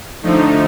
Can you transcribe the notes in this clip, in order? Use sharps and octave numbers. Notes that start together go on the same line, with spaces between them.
D3 F3 A3 D#4